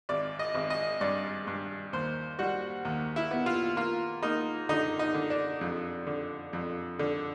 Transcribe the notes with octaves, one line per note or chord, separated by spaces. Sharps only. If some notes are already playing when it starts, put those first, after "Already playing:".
G#1 D5
D#5
G#1
D#5
G2 D5
G2
D#2 C5
G3 F#4
D#2
E4
B3
F4
A#3 F4
A#3 D#4
D3 D#4
D#4
D3
D4
F2
D3
F2
D3